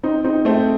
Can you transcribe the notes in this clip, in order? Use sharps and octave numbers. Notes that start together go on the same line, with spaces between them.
C4 D#4
C4 D#4
A3 C4